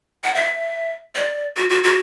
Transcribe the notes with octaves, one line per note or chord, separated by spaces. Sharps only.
F#5
E5
D5
F#4
F#4
F#4